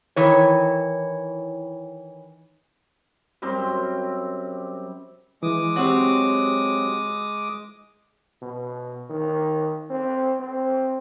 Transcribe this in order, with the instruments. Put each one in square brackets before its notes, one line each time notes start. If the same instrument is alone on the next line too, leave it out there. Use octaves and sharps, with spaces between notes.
[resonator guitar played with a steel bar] D#3 E3 C#5
[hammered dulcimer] F#2 G3 C4 C6
[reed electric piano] E3 [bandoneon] G#3 D6 D#6
[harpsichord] F#3 C4 [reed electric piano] F#4 G4
[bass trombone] B2
D#3
C4
C4